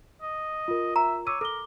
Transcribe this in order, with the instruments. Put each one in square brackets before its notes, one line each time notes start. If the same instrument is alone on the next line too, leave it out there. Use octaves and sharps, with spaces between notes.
[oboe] D#5
[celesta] F4 A#4
[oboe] E5 [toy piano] A#5
[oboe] C#5 [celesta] D6 E6 D#7
[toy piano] A4 [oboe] A#4 [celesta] D6 G7